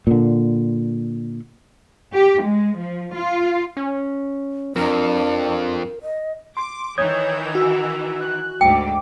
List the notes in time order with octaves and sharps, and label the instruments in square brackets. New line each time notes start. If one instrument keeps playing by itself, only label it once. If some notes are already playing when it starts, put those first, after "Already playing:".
[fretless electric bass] A#2 D3
[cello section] G4
G#3
F3
F4
[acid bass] C#4
[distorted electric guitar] F2 [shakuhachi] D4 [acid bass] A#4
[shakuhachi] D#5
[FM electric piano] C6 [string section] D6
[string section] D#3 E3 [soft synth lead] C#5 [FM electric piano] D#6 G6 G#6
[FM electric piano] F#4 [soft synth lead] E6
[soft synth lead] F#6
[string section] D2 G#2 [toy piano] G5 [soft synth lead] D6